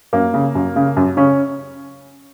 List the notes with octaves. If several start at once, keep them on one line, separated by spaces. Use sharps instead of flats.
F#2 A#3
C#3
F#2
C#3
F#2
C#3 C#4